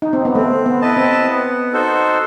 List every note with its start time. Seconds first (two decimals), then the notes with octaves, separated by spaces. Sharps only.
0.02 D#4
0.13 C4
0.25 B3
0.35 A3 C4
0.66 B3
0.82 E4 B4 D#5 A5
0.97 C4
1.27 B3
1.73 D#4 F#4 A4 C5